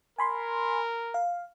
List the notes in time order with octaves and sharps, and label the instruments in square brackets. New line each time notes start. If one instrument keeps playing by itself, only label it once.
[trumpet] A#4 [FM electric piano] G#5 B5 C6
[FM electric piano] F5